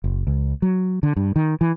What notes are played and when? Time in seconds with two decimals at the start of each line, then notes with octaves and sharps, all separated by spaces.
0.04 F#1
0.27 C#2
0.62 F#3
1.03 D3
1.17 G2
1.36 D#3
1.61 E3